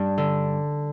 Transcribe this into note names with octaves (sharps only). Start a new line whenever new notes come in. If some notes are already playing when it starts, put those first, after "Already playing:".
Already playing: G2 D4
D3